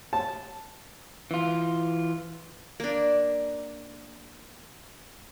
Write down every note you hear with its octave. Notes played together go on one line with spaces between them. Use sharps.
A5
E3 F4
A#3 D4